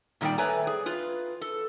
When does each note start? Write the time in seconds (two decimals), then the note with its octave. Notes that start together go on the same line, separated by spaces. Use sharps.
0.21 A#2 D#3 G3 G4 D5 G5
0.38 A3 B4 C#5 G#5 A#5
0.67 G#4
0.86 F4 B4
1.41 A4